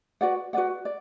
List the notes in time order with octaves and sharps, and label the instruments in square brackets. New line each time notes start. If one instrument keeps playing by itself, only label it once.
[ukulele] F#4 B4 D5 F#5
F#4 B4 D5 F#5
D5